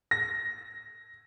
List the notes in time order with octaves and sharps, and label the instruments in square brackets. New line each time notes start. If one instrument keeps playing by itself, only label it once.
[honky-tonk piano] A#6